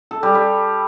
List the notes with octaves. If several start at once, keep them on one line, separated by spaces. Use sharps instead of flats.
A4
G3
G3